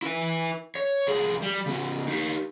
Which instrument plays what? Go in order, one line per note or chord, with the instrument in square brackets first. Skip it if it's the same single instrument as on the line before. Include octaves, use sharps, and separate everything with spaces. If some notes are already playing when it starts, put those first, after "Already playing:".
[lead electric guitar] E4 B4
C#5
C2 G#4
G3
C#3 B3
D#4 G4